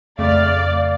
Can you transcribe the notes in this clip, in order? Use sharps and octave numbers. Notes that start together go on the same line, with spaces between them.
F2 C#3 A3 D5 F5